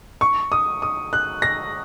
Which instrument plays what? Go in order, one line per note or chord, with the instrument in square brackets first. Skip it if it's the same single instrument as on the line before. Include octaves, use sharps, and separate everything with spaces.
[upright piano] C#6
D#6
D#6
F#6
A#6